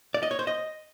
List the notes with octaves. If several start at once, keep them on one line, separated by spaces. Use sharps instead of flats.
D5
D#5
C#5
C5
D#5